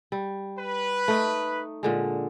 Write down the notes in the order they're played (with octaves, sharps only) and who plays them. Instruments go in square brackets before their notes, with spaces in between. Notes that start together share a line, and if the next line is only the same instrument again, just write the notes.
[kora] G3
[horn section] B4
[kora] A3 D#4
A#2 D3 G#3